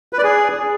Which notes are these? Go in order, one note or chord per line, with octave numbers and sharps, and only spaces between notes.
B4
D5
G#4